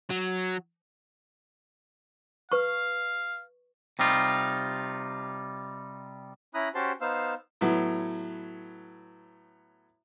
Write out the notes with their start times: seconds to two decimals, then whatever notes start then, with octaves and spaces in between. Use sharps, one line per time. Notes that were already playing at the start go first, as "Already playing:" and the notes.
0.10 F#3
2.52 B4 F5 C#6
3.99 C3 G3 D#4 F4
6.54 C#4 E4 A#5 B5 D#6 F#6
6.75 C#4 F#4 G4 C5 A5 C6
7.01 B3 D#4 C5 F5 E6
7.61 A2 F#3 B3